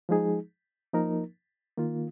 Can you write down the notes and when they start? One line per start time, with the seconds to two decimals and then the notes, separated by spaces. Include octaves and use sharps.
0.09 F3 G#3 D#4 G#4
0.94 F3 A#3 D#4 A#4
1.78 D#3 A#3 F4